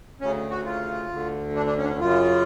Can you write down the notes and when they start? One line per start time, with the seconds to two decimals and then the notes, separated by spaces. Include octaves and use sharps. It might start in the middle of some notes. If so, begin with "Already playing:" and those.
0.21 D2 C#3 C#4
0.50 F#4
0.65 F4
1.10 D2 D3
1.56 D4
1.66 D4
1.78 C#4
1.83 D4
1.89 C#4
1.99 F#2 C#3 F4